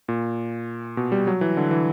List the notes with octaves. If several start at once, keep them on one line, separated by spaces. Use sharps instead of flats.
A#2
B2
G3
F#3
E3
D3
E3